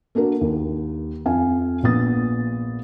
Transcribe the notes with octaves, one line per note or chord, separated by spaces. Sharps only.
A#3 D4 F#4 A#4
D#2
F2 F5 G#5
A#1 A#2 B3 D#6 A6